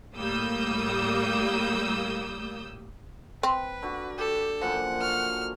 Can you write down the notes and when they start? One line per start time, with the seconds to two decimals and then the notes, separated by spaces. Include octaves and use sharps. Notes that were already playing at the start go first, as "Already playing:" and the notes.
0.15 A2 G3 A#3 D#6 E6 G6
3.43 C4 B4
3.82 D3 F#4
4.18 G4 A4
4.61 F#2 A#2 F3 F#5
5.01 D3 F#4 F6